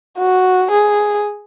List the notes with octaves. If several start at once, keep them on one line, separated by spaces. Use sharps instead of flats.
F#4
G#4